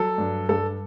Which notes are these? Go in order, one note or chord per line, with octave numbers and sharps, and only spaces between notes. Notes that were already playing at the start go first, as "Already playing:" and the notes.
Already playing: F#3 A4
G2
G2 A4